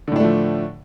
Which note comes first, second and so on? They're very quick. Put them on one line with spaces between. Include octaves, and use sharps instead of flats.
D3 A2 D4 A3 F3